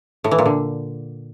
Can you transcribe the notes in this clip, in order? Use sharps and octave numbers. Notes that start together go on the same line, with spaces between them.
A2
E3
A#2
D3